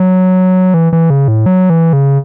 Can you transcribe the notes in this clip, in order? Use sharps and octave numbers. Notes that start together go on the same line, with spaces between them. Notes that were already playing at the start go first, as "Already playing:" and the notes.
Already playing: F#3
E3
E3
C#3
A2
F#3
E3
C#3